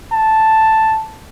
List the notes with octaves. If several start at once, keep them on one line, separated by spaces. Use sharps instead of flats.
A5